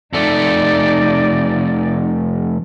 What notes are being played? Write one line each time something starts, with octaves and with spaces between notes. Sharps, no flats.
F2 A3 D#4 D5